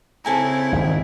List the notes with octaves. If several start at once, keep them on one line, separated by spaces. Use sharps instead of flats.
C#3 C4 E4 A4 G#5 A#5
G#1 G#2